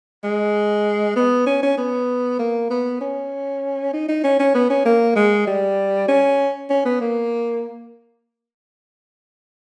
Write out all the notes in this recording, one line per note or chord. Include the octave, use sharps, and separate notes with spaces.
G#3
B3
C#4
C#4
B3
A#3
B3
C#4
D#4
D#4
C#4
C#4
B3
C#4
A#3
G#3
G3
C#4
C#4
B3
A#3